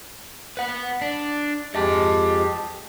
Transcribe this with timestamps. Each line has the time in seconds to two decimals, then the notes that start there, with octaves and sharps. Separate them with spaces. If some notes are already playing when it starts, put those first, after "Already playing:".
0.57 B4 F#5
1.02 D4
1.75 F2 G#3 G4 D#5 A5